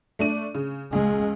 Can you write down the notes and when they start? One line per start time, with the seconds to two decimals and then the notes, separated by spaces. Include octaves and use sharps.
0.19 A3 D4 D#7
0.55 C#3
0.93 C#2 G#3